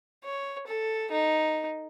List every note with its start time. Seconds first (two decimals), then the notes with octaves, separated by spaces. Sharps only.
0.24 C#5
0.67 A4
1.11 D#4